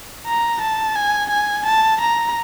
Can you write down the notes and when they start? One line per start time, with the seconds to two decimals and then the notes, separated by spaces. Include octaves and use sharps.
0.26 A#5
0.61 A5
0.96 G#5
1.30 G#5
1.66 A5
2.01 A#5